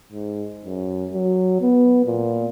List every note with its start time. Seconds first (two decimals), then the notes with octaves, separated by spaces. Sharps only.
0.12 G#2
0.65 F#2
1.13 F#3
1.61 B3
2.06 A#2